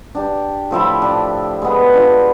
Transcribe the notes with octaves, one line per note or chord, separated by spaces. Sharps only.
D4 G4
A2 F3 E5 B5
D4
G#3 B3
D4 F4